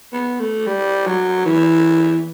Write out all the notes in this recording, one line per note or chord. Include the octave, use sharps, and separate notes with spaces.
B3
A3
G3
F#3
E3